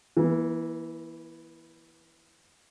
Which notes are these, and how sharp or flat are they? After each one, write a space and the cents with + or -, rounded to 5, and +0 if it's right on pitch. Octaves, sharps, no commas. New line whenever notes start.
E3 +0 A#3 +45